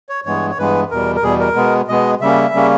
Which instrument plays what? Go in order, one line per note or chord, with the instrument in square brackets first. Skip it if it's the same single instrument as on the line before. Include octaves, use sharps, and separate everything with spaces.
[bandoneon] C#5
G2 E3 G#3 B3 C#5
C#5
G2 E3 G#3 B3 B4
E2 B2 G3 A#4
A#4
E2 B2 G3 G#4
A#4
B2 G#3 B3
B2 G#3 B3 D#5
C#3 G3 A#3 C#4 E5
C#3 G3 A#3 C#4